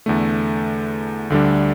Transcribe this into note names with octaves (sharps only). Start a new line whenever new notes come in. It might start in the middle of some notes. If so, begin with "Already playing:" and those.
E2 D3 A3
D2 D3 G3 D4